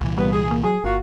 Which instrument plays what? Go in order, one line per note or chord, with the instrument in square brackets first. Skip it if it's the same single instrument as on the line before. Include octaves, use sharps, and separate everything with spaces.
[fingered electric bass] C2 A#2 E3
[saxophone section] C#3 A#3 B3 [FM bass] G3
[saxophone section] G#4
[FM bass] A#3
[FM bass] F#3 [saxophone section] G#4
[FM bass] G1 [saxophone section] A#3 F4 F#4